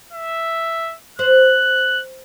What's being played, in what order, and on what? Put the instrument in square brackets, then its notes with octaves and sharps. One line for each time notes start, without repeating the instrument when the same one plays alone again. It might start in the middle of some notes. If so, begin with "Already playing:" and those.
[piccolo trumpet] E5
[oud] C5 [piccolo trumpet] F#6